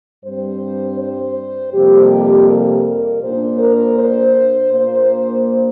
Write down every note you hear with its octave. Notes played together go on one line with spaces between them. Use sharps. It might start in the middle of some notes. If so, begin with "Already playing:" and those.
G2 G3 C4 C5
C5
F2 C3 G3 A#3 G4
A#4
A#2 A#3 D4 C5
A#4
C5
A#2 A#3 D4 C5